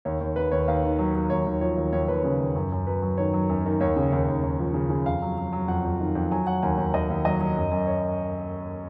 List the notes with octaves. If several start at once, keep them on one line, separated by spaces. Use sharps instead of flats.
D#2 C#5
D#2
D#2 B4
D#2 C#5
D#2 F5
D#3
F#3
F#3
D#2 C#5
D#2
F3 C#5
D#2
D#2 C#5
D#2 B4
C#3 C#5
D#2
F#2
F#2
F#3 B4
F#3
D#3 C#5
F#3
F#2
D#3
D#2 C#5
C#3
D#2
D#2
D#2
F3
C#3
C#3
F2 F5
F#3
F#3
F#3
F2 F#5
F2
D#3
F2
F#3 G#5
F#3 F#5
D#2 G#5
D#2
D#2 D#5
D#2
F#3 D#5
F#3
F#2
F#2
C#5